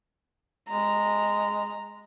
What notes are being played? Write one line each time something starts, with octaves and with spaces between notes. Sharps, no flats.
G#3 A#5